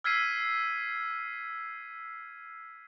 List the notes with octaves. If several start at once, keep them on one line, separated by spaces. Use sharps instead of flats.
E6 F6 G#6 B6 C7 D#7